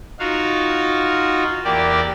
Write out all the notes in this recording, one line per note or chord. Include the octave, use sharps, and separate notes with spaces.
D#4 F4 F#4 F5
E2 A#3 G4 D5